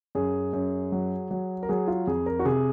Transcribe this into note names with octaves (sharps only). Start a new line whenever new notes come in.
F#2 G#4
F#2
F#3
F#3
A#4
F#3 G#4
F4
F2 G#4
A#4
F#4
C3 G#4